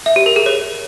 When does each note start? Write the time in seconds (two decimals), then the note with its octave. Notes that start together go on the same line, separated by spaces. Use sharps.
0.06 E5
0.16 G4
0.26 A#4
0.36 G#4
0.46 C#5